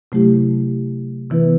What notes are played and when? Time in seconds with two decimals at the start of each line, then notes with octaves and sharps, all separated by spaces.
0.12 C3 F#3 A3 E4 G4
1.30 C3 E3 B3 E4 B4